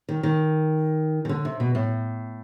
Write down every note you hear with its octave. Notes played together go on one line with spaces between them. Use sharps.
D#3
D#3
D#3
D3
C3
B2
A2